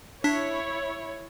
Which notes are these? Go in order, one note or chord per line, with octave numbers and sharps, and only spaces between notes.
D4 E4 C#5 B6